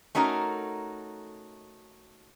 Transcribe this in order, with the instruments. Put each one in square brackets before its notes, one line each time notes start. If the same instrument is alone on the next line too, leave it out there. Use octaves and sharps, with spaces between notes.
[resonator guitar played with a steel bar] A3 C#4 D#4 F#4 A#4